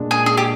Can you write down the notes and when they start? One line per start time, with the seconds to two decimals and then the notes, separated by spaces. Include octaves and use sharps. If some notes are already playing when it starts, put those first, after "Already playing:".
Already playing: A#2 G#3 D4
0.11 G#4
0.26 G#4
0.37 G4